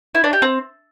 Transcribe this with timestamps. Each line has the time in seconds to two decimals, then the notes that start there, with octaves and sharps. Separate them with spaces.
0.15 E4
0.24 D4
0.33 G4
0.42 C4